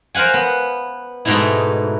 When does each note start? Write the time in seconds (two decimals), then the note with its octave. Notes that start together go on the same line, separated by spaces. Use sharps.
0.15 A#4 C5 F5 F#5 G#5
0.34 B3
1.25 G#2 B2 A3 D#4 E4